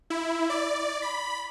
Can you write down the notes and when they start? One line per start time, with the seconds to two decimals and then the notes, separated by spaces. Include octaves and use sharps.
0.10 E4
0.50 D5
1.02 B5